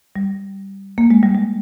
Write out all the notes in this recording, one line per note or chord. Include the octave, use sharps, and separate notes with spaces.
G3
A#3
G#3
G3
G#3